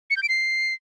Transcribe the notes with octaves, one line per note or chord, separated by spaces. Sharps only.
C#7
G6
D7
C7